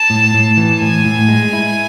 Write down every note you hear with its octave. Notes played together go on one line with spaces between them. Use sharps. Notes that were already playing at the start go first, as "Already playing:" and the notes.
Already playing: A5
A2
A2
E3
A2 G#5
A2
G#3
E4